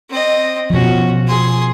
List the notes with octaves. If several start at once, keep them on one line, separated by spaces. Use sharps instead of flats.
C4 D#5
B2 F3 C#4 F#4
G#4 C6